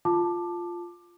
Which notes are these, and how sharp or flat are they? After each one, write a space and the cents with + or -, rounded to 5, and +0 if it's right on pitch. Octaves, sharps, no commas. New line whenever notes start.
F4 +0 A5 +0 D6 +15